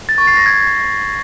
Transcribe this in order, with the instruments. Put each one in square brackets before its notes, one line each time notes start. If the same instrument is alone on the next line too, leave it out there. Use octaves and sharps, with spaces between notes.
[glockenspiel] A6
C#6
C7
A#6
G#6